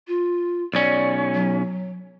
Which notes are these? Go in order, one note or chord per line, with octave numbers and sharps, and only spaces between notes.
F4
B1 C#4 D5
F#3